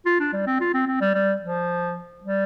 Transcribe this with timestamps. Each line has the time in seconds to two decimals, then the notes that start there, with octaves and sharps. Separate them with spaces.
0.06 F4
0.20 D4
0.33 G3
0.46 C4
0.60 F4
0.74 C4
0.87 C4
1.01 G3
1.14 G3
1.42 F3
2.23 G3